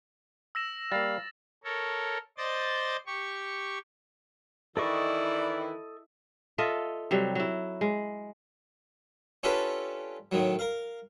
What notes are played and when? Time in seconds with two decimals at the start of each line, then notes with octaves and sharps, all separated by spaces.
0.55 E6 A#6 E7
0.92 G3 A#3 F5 A6
1.64 A4 A#4 C#5
2.38 C5 D5 D#5 G6 A6
3.06 G4 C#6
4.77 D#3 E3 E4 A4 D5 D#5 C#6
6.58 F4 A4 D#5 E5
7.11 C3 F#3 G3
7.35 F#3 E4
7.81 G#3
9.43 C#4 D4 F4 G4 A4 B4
10.32 A2 D#3 F#3
10.59 A#4 F5